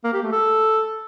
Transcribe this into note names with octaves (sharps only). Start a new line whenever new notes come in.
A#3
G4
A3
A4